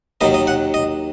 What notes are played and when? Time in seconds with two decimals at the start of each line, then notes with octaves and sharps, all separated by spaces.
0.21 D#2 D#3 F#3 D#5
0.34 D#5
0.47 F#5
0.74 D#5